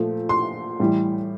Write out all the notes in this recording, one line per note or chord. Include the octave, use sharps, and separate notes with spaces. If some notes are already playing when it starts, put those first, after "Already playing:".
Already playing: A#2 F3 A3
C6
A2 E3 G3